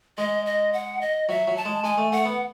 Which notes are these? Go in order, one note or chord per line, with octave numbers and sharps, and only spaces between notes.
G#3 D#5
D#5
F#5
D#5
F#3 E5
F#3
A5
G#3
G#3 G#5
A3
A3 F#5
B3